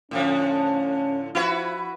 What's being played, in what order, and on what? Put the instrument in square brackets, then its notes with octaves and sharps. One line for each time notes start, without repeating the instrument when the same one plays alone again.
[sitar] A2 D3 F3 [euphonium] C#4
[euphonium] F3 [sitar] E4 F#4 B4